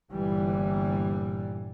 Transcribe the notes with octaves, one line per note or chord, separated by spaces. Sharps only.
G1 A#2 E3 G3